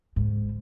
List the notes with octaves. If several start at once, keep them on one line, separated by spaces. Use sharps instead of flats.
G#2